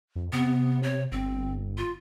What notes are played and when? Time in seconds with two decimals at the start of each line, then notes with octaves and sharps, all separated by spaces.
0.15 F2
0.33 C3 B3
0.83 C#5
1.12 G1 C4
1.78 F4